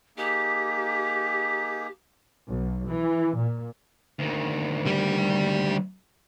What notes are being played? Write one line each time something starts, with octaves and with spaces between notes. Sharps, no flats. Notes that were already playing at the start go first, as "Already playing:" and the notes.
A#3 D#4 G4 G#4
B1
E3
A#2
D2 D#3
G3 G4